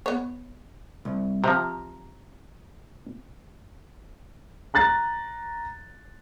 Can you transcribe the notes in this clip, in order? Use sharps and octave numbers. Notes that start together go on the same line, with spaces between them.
B3 C#5
C2
C3 F3 A#5
A#5 F#6 A6